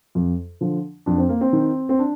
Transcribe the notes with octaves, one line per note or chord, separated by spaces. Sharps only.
F2
D3 F3
F2 D4
C4
A#3
C4
D#3
C4
D4